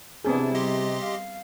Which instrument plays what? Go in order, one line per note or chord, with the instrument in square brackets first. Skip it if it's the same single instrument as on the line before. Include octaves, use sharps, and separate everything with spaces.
[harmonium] C3 [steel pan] B3 C4 G#4 [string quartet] D4 E4
[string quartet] G3 [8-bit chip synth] G4 D#5 C6
[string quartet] F5